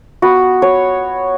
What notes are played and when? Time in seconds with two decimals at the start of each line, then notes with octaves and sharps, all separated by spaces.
0.22 B3 F#4
0.62 C#5